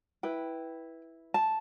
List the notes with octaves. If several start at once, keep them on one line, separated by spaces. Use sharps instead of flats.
E4 B4 G5
A5